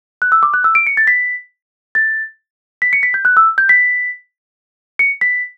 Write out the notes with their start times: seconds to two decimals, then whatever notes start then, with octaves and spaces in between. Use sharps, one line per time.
0.22 F#6
0.32 E6
0.43 D6
0.54 F#6
0.64 E6
0.75 D7
0.87 C#7
0.97 A6
1.07 B6
1.95 A6
2.82 B6
2.93 C#7
3.03 B6
3.14 G6
3.25 F#6
3.37 E6
3.58 G6
3.69 B6
4.99 C#7
5.21 B6